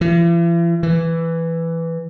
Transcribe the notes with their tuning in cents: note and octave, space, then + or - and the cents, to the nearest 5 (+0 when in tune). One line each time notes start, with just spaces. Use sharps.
E3 +45
E3 +5